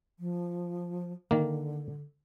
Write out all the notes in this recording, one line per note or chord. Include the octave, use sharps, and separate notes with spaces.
F3
D3 D#3 A#3